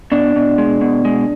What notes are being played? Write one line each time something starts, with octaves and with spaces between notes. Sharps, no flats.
B2 D4
B2
G#3
B2
G#3